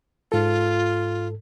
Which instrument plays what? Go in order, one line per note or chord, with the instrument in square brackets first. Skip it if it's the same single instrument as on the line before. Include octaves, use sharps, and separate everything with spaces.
[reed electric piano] G#2 A4 [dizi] F4